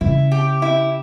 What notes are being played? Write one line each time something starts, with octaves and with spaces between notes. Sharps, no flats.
C#3 E4
G4
E4